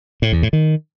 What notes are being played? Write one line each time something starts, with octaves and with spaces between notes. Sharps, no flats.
A2
E2
A2
D#3